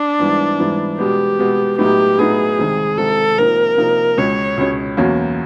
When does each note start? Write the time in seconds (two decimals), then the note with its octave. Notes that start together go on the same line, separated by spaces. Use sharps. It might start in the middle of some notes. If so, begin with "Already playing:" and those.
Already playing: D4
0.19 G#2 E3 G3 B3 E4
0.59 G#2 E3 G3 B3 E4
0.99 B2 G#3 B3 G4
1.38 B2 G#3 B3
1.78 A2 F#3 B3 D#4 G4
2.18 A2 F#3 B3 D#4 G#4
2.58 C2 C3 D#3 G#3
2.97 C2 C3 D#3 G#3 A4
3.38 C3 F3 A#3 D#4 A#4
3.78 C3 F3 A#3 D#4
4.17 C#2 B2 G#3 C#4 C#5
4.57 C#2 B2 G#3 C#4
4.97 E2 B2 F#3 A#3 C#4